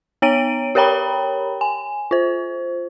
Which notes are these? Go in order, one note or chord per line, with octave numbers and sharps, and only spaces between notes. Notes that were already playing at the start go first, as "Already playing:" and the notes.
B3 C#5 A#5 D7 D#7
G4 A#4 C#5 G5 A#5 B5
G#5
F4 C5